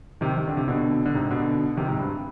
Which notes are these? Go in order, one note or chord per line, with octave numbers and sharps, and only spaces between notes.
C3 D#3
D#3
D3
C3
B2 D3
D3
G#2 C3
B2 D3
C3 D#3
G#2 C3
G2